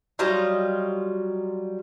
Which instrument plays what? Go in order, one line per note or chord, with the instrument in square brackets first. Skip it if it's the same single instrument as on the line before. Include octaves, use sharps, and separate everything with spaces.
[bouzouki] F#3 G3 F4 D#5